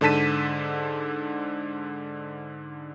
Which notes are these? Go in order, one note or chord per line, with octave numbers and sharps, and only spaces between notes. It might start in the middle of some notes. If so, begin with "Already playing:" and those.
G#2 D3 A4 A5 B6 D#7